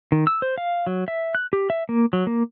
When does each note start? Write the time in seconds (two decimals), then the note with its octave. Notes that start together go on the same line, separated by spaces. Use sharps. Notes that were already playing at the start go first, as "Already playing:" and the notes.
0.12 D#3
0.27 E6
0.42 C5
0.58 F5
0.87 F#3
1.08 E5
1.35 F#6
1.53 G4
1.70 E5
1.89 A#3
2.13 F#3
2.27 A#3